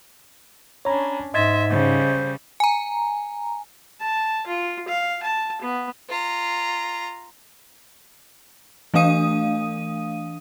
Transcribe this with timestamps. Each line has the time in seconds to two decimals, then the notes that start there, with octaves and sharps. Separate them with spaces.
0.85 C#4 D4 C#5 A#5 B5
1.34 G#2 D#5 E5 C6 G#6 A6
1.69 C#3 G3 C5
2.60 G#5 A#5
4.00 A5
4.47 F4
4.88 F5
5.23 A5
5.61 B3
6.09 F4 A#5
8.94 E3 A3 D4 F5 D#6 D#7